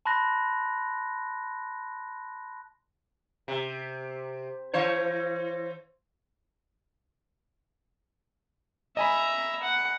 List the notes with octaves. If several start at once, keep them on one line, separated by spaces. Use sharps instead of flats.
A5 B5 C6 F#6 A#6
C3
E3 C5 C#5
D#5 E5 G#5 A#5 B5
F#5